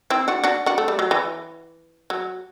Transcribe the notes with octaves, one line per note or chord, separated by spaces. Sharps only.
C4 E4
D4 F#4
D4 F#4
D4 F#4
A3
G3
F#3
E3
F#3